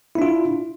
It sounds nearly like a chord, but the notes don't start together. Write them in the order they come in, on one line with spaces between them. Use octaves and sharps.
E4 D4 F4